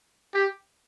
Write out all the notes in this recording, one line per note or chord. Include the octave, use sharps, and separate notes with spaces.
G4